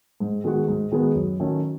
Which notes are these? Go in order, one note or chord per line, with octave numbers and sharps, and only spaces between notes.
G#2
D#3 G#3 B3 F#4
G#2
D#3 G#3 B3 F#4
F#2
D#3 F#3 A3 C#4